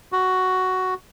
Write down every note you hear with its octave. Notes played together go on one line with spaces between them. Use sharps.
F#4